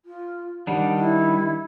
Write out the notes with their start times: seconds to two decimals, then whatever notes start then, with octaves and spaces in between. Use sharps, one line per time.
0.05 F4
0.67 D#3 G3 D4 F#5
0.97 E4